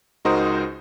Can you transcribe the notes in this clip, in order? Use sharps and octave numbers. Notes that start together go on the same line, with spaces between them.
C#2 D#4 F#4 A#4 C5 D#6